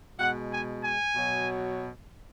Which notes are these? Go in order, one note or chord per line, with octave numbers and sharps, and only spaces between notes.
B2 G#3 F#5
G#5
G#5
B2 F#3